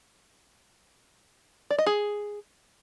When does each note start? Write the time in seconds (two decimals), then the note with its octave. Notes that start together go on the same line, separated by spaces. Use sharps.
1.70 D5
1.78 D#5
1.86 G#4